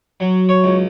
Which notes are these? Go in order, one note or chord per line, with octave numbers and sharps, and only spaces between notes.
F#3
C#5
C#2